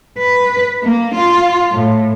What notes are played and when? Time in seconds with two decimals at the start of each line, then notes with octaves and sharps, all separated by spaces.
0.19 B4
0.84 A#3
1.15 F4
1.72 A2